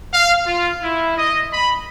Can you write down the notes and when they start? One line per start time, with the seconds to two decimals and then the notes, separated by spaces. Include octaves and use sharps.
0.13 F5
0.45 F4
0.83 E4
1.18 D#5
1.52 B5